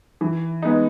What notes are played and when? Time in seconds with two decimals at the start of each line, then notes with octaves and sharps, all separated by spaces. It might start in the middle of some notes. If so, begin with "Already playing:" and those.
0.21 E3
0.62 G#3 B3 D#4